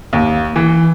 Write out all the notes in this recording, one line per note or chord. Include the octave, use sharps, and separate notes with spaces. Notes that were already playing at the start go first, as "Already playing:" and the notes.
D#2
E3